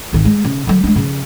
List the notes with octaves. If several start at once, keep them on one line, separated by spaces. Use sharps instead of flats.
G#1 D#3
G#3
C#3
D3 F#3
G#3 D4
C#3 F3